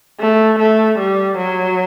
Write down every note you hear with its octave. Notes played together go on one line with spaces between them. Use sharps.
A3
A3
G3
F#3